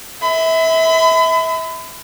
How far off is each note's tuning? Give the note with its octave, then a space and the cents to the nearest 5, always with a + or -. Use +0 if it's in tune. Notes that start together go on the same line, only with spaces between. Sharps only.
E5 -25 B5 +35